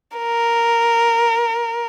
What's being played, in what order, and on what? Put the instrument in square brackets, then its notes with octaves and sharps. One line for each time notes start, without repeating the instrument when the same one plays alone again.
[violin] A#4